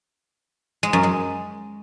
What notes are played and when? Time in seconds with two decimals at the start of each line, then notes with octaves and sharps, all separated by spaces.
0.83 G#3
0.93 F#2
1.03 G#3